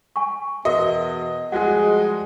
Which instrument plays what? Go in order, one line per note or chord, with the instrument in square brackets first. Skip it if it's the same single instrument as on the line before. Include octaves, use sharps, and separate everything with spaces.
[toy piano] G#5 C#6
[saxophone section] E2 B2 [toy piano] F#4 A#4 E5 [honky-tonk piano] D#5
[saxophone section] F3 G3 G#3 [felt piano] F#4 G#4 [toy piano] F#5